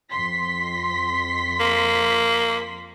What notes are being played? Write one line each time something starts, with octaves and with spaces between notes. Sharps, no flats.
F2 C6 B6
A#3